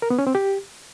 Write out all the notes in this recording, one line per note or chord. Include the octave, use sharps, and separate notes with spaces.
A#4
B3
C#4
C4
G4